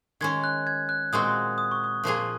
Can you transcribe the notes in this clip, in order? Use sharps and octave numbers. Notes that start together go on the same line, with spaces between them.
D#3 G#3 C#4 G#6
F#6
G#6
F#6
A#2 G#3 C4 F#4 D#6
D#6
C#6
D#6
A#2 F3 A#3 F4 G#4